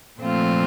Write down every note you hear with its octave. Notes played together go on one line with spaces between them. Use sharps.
A#2 F3 A3 C4 F4